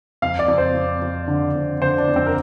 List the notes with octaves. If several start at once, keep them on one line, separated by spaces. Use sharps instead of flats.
F2 F5
D5
F2
C5
F2
F2
D3
F2
D3 C5
D4
F2
C4
A#4